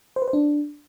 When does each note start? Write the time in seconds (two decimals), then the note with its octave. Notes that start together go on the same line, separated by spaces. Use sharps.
0.16 C5
0.22 B4
0.28 C5
0.33 D4